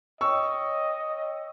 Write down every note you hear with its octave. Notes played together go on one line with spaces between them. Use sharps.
C#5 D#5 G5 C#6 E6